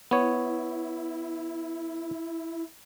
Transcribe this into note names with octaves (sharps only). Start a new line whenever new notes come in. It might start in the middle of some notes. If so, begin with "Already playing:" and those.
B3 E4 C#5